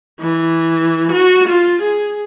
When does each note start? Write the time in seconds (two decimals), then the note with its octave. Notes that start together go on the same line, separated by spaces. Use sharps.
0.20 E3
1.12 F#4
1.48 F4
1.82 G#4